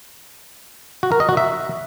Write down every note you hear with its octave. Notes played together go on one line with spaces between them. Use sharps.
F#4
A#4
D#5
F#4
E5